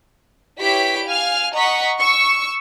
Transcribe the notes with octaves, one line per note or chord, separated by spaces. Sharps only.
E4 G4 B4 C#5 B6 D7
F5 G#5 F6
D#5 F#5 A#5 C#6 B6
C#6 E6